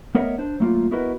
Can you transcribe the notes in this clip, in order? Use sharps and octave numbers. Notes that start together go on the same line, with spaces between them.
A3 B3 A#4 C#5 D#5 E5
D4 C5
F#3 A3 A#3 F4
B3 E4 F#4 A#4 B4 D#5